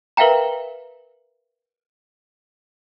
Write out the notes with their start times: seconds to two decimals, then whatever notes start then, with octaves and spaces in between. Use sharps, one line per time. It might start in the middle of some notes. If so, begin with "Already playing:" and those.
0.17 A#4 B4 E5 F5 G5 A#5